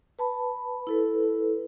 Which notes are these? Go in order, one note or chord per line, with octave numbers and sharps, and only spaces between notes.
B4 A5 B5
E4 A4 B4